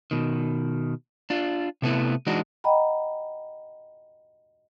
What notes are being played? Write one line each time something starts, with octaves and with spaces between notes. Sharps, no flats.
B2 D#3
D4 F4
C3 A3 B3 E4
E3 G#3 D4 D#4 F#4
D#5 F#5 G5 A#5 B5